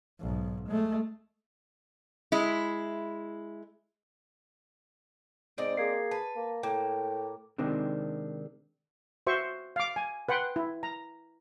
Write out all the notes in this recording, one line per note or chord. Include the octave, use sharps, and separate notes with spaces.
B1 G#2
G#3 A3
G#3 E4
G#2 C4 D5 D#5
A#3 G#4 G#6 C7
B4 A5
A#3
A2 A#3 G5
C3 D#3 G#3 C4 D4
F#4 C5 E5 C#6
F5 D6
G#5
B4 F#5 G5 C6
E4
A#5